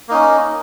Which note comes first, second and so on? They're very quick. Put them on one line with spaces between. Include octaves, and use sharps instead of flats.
A#3 D#4 C#4